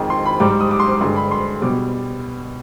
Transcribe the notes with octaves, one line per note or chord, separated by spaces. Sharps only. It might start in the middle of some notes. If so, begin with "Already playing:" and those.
Already playing: F2 D#3 G#3
C6
B5
G#2 G3 D6
D#6
D6
C6
D6
G2 D3 G#3 C6
B5
C6
B2 G3 D6